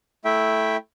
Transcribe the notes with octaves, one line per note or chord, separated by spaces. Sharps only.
A3 E4 E5 G5